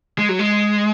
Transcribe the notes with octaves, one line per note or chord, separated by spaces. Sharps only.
G#3
F#3
G#3